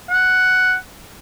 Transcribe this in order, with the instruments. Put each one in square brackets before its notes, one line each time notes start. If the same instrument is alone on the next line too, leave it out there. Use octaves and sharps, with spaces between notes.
[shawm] F#5